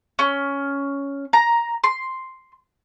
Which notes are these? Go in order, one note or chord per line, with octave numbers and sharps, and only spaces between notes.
C#4
A#5
C6